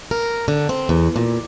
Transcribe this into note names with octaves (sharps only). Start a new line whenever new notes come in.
A#4
D3
C4
E2
A#2